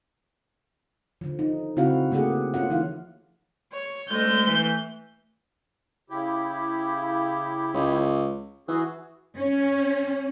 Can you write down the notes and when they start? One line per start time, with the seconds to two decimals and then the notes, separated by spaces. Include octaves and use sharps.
1.21 D3 F3
1.39 D#4
1.77 C#3 C4 E4 F#4 F5 F#5
2.11 D3 A3 A#3 G4 G#4 F#5
2.54 A#3 C#4 F4 F#5
2.70 E3 F3 D#4 E4 F5
3.72 C#5
4.10 D2 G#3 A3 G6
4.46 E3
6.10 C#3 E4 G4
7.74 C#2
8.68 E3 F#4 G#4
9.37 C#4